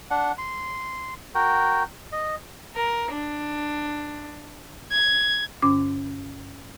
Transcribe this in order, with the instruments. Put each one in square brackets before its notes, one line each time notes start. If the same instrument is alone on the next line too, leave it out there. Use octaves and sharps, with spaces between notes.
[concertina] D4 F#5
C6
F#4 A#4 G5
D#5
[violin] A#4
D4
G#6
[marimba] G2 D3 C#4 D6